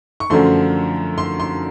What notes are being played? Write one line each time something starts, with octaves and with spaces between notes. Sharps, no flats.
C#6
F#2 D3 F3 A3 C6
C6
C6